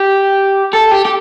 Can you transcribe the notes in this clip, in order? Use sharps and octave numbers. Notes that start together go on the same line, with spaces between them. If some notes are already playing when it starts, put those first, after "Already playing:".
Already playing: G4
A4
G4
G4